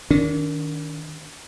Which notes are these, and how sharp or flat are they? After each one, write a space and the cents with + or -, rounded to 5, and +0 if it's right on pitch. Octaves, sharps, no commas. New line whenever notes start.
D#3 +0 D4 -35